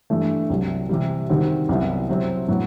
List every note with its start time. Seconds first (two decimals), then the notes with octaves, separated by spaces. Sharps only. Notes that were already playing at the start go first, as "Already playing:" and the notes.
0.10 G2 E3 A3
0.50 C2 C3 F#3
0.89 C3 E3 G3
1.29 C3 D#3 G3 C4 F#4
1.69 C2 C3 F#3 B3 E4
2.09 C3 F#3 C4 E4
2.48 A2 F#3 B3 F#4